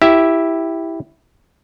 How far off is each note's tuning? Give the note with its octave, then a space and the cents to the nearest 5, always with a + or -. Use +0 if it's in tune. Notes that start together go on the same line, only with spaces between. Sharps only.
E4 +0 G4 +0 E5 +0